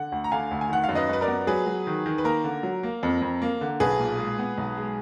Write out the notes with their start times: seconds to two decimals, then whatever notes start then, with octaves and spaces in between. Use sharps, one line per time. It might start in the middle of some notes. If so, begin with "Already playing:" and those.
Already playing: D3 F#5
0.12 D2
0.24 A#5
0.32 D3 F5 G#5
0.51 D2
0.61 G#5
0.69 D#3 F#5
0.84 F5
0.89 F#2
0.95 B4 D#5
1.09 F#2 B4
1.21 A#4 D5
1.28 B3
1.47 F#3 G#4 B4
1.66 F#3
1.87 D#3
2.06 D#3
2.18 B4
2.24 A#3 A#4
2.44 D3
2.63 F#3
2.83 A#3
3.03 F2
3.22 F2
3.42 A#3
3.61 D3
3.80 B1 G#4 B4
3.99 A#2
4.19 G#3
4.39 B3
4.58 B1
4.77 G#3